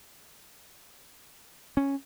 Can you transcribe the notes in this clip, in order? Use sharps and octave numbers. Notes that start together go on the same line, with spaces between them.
C#4